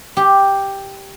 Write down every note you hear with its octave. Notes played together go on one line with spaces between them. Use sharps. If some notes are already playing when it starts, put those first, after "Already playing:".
G4